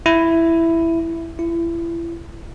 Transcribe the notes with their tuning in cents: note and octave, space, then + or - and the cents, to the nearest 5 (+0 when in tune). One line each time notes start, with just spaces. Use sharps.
E4 +5
E4 +30